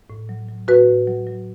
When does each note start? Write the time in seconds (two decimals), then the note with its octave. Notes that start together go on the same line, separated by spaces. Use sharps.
0.10 A2
0.29 F#3
0.48 F#3
0.68 A2 F#4 B4
0.88 A2
1.07 F#3
1.27 F#3